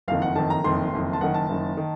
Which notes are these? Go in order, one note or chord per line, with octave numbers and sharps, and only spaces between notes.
F#1 F2 D#3 F5
F#5
F#1 F2 D#3 A5
A#5
F#1 F2 D#3 C6
F#1 F2 D#3
A5
F#1 F#2 D#3 F#5
A5
F#1 F#2 D#3
D#3